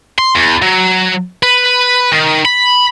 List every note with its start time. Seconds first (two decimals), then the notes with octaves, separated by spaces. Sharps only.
0.18 C6
0.35 E2
0.62 F#3
1.43 B4
2.12 D#3
2.45 B5